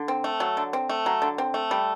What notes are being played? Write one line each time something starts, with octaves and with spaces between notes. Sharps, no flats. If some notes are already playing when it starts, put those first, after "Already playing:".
Already playing: D3
C4
A3
F#3
D3
C4
A3
F#3
D3
C4
A3
G3